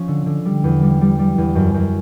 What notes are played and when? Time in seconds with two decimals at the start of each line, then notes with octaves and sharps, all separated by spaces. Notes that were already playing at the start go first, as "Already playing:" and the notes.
Already playing: F3 C#4
0.08 D3
0.26 D3
0.45 G3
0.64 E2
0.82 G3
1.01 G3
1.19 G3
1.38 E2
1.55 F#2
1.74 F#2